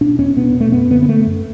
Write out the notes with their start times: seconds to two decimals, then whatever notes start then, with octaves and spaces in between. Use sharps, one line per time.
0.01 B2 D4
0.19 E2 C#4
0.37 B2 B3
0.54 B2
0.61 A3
0.72 F#2 B3
0.90 D3 B3
1.03 B3
1.08 F#2 A3
1.27 F#2